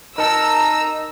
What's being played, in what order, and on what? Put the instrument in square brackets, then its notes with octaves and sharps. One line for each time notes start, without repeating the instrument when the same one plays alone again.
[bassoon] D#4 [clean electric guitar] A#4 A5 [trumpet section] A#5 [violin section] E6